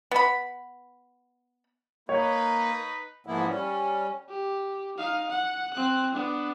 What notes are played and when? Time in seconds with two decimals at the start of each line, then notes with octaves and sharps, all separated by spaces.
0.11 B3 B5
2.09 A#3 D#4 B4 C#5
3.26 G#2 E3 F3 A#3 B3 E4
3.47 G3 C#4
4.29 G4
4.97 D#4 F5
5.30 F#5
5.74 C4 F#6
6.13 B3 D4